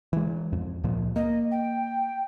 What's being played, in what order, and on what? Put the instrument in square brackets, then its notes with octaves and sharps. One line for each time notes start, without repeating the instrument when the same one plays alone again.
[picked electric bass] E3 G#3
F2
C#2 A#2 F3
[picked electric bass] A#3 [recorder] D#5
[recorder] G5